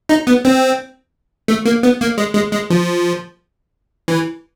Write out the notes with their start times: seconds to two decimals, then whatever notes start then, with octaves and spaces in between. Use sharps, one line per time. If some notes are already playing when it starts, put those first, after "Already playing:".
0.09 D#4
0.27 B3
0.45 C4
1.48 A3
1.65 A#3
1.83 B3
2.01 A#3
2.18 G#3
2.35 G#3
2.52 G#3
2.70 F3
4.08 E3